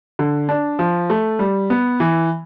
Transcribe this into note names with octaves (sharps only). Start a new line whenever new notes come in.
D3
D4
F3
A3
G3
B3
E3